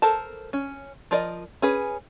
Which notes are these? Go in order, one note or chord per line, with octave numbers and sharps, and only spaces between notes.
A4 A#4 C5 A5
C#4
F3 A#4 D5 D#5
C#4 G#4 B4